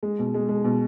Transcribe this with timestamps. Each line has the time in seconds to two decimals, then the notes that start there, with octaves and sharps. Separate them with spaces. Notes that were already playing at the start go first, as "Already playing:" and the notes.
0.03 G#3
0.19 B2
0.34 G#3
0.49 G#3
0.64 B2